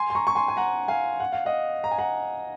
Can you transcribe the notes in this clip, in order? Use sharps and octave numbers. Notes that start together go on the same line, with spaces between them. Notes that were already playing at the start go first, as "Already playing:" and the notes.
Already playing: G#5 C6
C6
A#5 C#6
C#6
G#5 C6
G#5
F#5 A#5
F5 G#5
F#5
F5
D#5 F#5
A#5
G#5
F#5 A#5